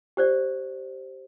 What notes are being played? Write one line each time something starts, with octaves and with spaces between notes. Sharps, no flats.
G4 C5 D5